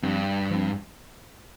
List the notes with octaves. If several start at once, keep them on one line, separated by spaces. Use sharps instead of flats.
G2 F3 C4
F3 C4